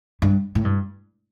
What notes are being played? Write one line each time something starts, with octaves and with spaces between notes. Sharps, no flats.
G2
A2
G2